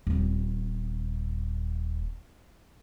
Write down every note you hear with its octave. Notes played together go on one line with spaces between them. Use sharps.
D#1 C4